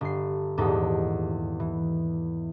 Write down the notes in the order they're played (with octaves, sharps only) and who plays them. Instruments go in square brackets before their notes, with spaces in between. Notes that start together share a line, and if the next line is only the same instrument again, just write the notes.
[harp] G1 C7
D#1 E2 G#2 G3 D#4 A4
E3